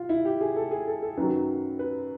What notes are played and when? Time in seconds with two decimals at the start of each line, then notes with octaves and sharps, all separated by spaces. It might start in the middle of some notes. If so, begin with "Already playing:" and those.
Already playing: F4
0.09 E4
0.25 G4
0.41 G#4
0.56 A4
0.71 G#4
0.87 A4
1.02 A4
1.17 F#2 D#3 F#3 B4
1.79 B4